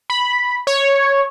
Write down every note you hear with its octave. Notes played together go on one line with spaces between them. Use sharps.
B5
C#5